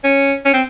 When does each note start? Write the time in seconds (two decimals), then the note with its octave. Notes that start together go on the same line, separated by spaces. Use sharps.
0.04 C#4
0.45 C#4
0.53 C4